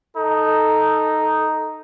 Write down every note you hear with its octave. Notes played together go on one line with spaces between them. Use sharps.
D#4 A4